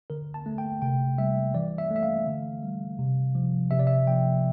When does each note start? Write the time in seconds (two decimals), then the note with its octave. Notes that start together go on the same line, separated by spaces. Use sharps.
0.10 D3 A#4
0.34 A5
0.46 A3
0.58 G5
0.82 C3 G5
1.18 G3 E5
1.55 E3 D5
1.78 E5
1.90 A3
1.96 E5
2.03 F5
2.27 D3
2.63 G3
2.99 C3
3.35 F3
3.71 C3 E5
3.79 D5
3.87 E5
4.07 F3 G5